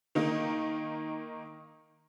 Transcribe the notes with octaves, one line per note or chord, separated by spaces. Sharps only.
D#3 A#3 D#4